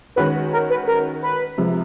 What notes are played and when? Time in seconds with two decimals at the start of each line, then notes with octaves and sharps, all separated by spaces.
0.16 D#3 G#3 C#4 F#4 B4
0.52 A#4
0.70 B4
0.87 A#4
1.22 B4
1.58 C3 F3 G#3